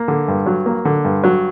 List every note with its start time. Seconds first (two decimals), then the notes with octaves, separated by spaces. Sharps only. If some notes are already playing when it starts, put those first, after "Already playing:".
Already playing: A#3
0.08 D3
0.28 G2
0.46 F#3
0.66 A#3
0.85 D3
1.05 G2
1.24 F#3